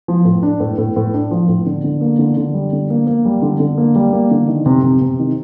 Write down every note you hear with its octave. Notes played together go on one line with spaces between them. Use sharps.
F3
A2
D4
A2
A2
A2
D4
F3
A2
D3
D3
A#3
D3
D3
G3
D3
A#3
A#3
G3
D3
D3
A#3
G3
A#3
D3
D#3
C3
C3
C3
D#3